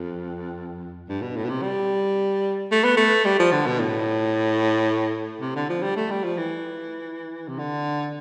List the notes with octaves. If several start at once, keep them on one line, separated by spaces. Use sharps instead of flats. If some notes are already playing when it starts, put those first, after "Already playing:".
Already playing: F2
G2
B2
A2
B2
C3
G3
A3
B3
A3
G3
F3
D3
B2
A2
C3
D3
F3
G3
A3
G3
F3
E3
C3
D3